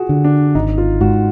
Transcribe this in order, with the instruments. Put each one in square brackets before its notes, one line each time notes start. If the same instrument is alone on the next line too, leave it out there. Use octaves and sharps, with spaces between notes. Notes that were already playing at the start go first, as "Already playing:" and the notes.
Already playing: [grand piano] F4 F#4 G#4
[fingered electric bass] D3
[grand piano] D4
[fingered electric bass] G#1 [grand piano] D#4
[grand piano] F4
[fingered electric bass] G#2 [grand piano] F#4